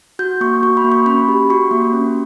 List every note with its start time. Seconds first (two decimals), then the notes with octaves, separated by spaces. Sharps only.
0.19 F#4 G6
0.41 A#3 C#6
0.63 F#4 C#6
0.77 B5
0.84 A#3
0.92 C#6
1.06 C#4 B5
1.28 G4
1.50 F#4 C#6
1.71 A#3
1.93 C#4